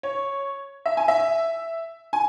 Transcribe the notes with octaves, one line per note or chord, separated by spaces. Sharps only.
C#5
E5
G#5
E5
G#5